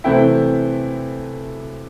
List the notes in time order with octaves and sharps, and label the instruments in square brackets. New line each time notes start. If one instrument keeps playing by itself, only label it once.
[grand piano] C3 E3 A3 C4 E4 G5